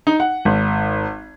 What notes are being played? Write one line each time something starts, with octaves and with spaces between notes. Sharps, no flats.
D#4
F#5
G#1